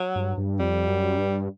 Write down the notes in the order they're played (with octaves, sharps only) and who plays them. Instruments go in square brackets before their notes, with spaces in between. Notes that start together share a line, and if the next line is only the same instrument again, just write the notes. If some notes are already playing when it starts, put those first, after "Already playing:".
Already playing: [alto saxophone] F#3
[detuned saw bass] G2
G2
[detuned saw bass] F2 [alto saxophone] G3
[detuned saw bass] F#2
G2